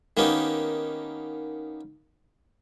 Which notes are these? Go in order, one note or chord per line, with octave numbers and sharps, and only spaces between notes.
D#3 A#3 B3 C#4 D#4 G4